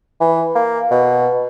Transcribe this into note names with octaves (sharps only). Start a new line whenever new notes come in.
E3
A#3
B2